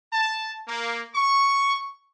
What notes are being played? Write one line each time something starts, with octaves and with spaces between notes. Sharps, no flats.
A5
A#3
C#6